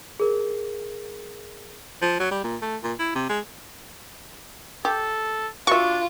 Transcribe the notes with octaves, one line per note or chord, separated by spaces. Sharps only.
G#4 A#4
F3
F#3
G3
A#2
A3
A#2
E4
C3
G#3
G4 A4
D4 F4 F#4 E5 C#6